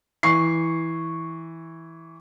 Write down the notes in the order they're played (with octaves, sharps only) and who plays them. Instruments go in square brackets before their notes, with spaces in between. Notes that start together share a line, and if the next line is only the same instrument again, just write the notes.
[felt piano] E3 C#6 C7